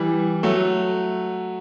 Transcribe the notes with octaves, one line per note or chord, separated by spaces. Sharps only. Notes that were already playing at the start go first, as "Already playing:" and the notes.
Already playing: E3 G3
F#3 A3